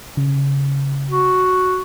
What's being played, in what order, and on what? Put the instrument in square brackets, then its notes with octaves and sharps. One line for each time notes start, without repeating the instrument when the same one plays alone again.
[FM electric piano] C#3
[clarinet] F#4